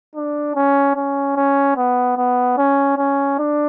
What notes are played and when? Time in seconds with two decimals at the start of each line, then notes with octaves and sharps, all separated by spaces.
0.16 D4
0.56 C#4
0.95 C#4
1.36 C#4
1.76 B3
2.17 B3
2.58 C#4
2.98 C#4
3.39 D4